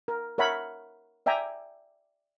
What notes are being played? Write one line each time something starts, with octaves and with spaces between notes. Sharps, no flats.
A#4
A#4 C#5 E5 F#5 B5
D5 E5 G5 G#5 A#5